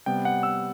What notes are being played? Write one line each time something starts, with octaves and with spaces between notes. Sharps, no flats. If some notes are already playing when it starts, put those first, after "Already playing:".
C3 G3 B3 G5
F#5
E6